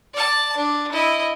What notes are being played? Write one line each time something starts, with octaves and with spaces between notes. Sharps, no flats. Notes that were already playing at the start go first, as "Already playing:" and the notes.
D5 A5
D4
E4 D#5